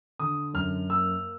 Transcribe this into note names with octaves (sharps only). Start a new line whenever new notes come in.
D3 D#6
F#2 F6
A#3 E6